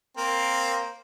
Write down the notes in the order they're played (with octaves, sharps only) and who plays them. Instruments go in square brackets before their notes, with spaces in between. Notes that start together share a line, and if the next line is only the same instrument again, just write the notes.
[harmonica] A#3 C4 A#4